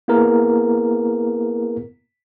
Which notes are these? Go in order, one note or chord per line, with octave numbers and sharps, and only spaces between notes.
A#3 B3 E4 G#4 A#4